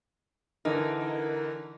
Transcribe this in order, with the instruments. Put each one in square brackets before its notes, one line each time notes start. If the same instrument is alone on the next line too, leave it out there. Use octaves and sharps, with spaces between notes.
[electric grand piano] D3 E3 A#4 [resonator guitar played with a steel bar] D#4